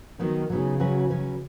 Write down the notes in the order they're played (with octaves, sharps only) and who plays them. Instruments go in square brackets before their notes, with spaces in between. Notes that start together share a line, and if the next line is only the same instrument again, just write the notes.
[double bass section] D#3 [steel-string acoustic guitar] F#3 B3 D#4
[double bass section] C#3 [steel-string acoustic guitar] F#3 B3 D#4
[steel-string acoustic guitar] F#3 C#4 F#4 B4
F#3 C#4 F#4 B4